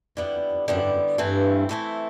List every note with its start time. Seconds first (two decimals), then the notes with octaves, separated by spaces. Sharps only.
0.17 F2 D3 G3 B3 E4 G4
0.34 F2
0.52 F2
0.68 F#2 D3 G3 B3 E4 G4
0.79 G2
0.89 F#2
1.18 G2 E3 A3 C4 E4
1.69 E3 A3 C4 E4